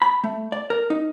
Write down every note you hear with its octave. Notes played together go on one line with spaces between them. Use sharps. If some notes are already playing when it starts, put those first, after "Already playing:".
B5
A3
D5
A#4
D#4